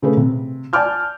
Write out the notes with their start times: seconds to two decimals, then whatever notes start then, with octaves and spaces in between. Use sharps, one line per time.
0.02 C#3 A3 G#4 B4
0.17 C3
0.73 D5 G#5 A5 D6 F6 G6